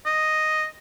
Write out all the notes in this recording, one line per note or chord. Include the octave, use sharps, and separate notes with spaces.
D#5